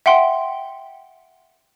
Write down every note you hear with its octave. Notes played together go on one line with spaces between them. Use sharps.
E5 F#5 G5 C6